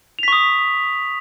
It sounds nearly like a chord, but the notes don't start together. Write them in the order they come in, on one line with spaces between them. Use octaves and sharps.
F7 B6 C#6 D#6